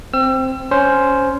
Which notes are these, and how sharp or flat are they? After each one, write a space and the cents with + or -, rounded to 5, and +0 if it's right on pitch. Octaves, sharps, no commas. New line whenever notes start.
C4 +0 E6 +35
C#4 +10 C5 +0